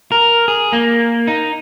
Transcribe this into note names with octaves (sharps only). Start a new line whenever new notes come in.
A#4
G#4
A#3
D#4